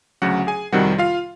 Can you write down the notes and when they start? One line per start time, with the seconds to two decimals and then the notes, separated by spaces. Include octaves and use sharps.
0.22 D2 C#3 F#3 F#4 F#5
0.47 G#4 G#5
0.73 F2 C3 D#3 G3 F#4 F#5
0.98 F4 F5